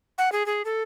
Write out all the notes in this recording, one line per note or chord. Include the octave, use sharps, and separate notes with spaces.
F#5
G#4
G#4
A4